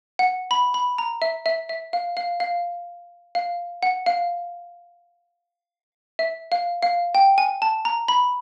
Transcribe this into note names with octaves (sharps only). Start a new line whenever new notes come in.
F#5
B5
B5
A#5
E5
E5
E5
F5
F5
F5
F5
F#5
F5
E5
F5
F5
G5
G#5
A5
A#5
B5